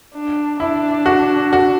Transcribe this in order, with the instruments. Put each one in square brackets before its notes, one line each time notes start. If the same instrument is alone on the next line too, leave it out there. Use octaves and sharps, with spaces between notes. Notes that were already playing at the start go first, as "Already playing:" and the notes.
[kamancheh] D4
[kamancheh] D4 [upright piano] E4
[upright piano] F#4
F#4